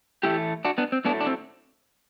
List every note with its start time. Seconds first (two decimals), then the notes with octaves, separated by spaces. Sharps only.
0.23 A2 E3 A3 E4 G4
0.65 D4 F#4
0.78 B3 D4
0.92 C4
1.05 A2 F#3 A3 B3 D4
1.20 D4
1.27 C4